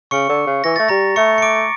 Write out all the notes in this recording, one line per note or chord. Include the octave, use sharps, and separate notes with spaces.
C#3 C#6 C#7
D3
C#3
E3 A#6
A3 A6
G3 A#5 A#6
A3 C#6 C#7
C#7
D6 D7